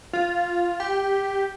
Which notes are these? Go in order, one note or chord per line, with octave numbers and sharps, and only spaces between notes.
F4
G4